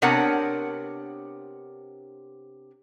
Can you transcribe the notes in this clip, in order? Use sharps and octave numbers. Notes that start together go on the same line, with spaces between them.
C3 B3 D4 A#4 C#5 F#5